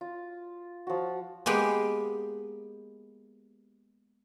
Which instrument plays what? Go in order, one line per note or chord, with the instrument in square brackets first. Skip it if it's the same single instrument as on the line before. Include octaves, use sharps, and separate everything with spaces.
[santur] F4
F3 F#4
[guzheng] G#3 A#3 B3 G4